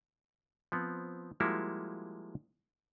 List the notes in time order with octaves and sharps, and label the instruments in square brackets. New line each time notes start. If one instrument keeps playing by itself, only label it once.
[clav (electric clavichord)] F3 B3 C4
F3 G3 G#3 A#3 E4 F#4